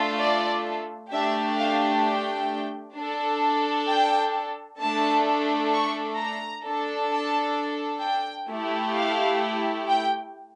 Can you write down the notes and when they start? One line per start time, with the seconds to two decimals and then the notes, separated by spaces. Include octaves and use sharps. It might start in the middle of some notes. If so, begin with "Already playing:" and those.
Already playing: A3 D4 F4 A4
0.19 D5
1.11 A3 D4 G4 E5
1.57 F5
2.04 G5
2.96 D4 A4
3.88 G5
4.80 A3 D4 A4 A5
5.73 C#6
6.19 A#5
6.65 D4 A4
7.11 A5
8.03 G5
8.49 A3 E4 G4
8.95 F5
9.88 G5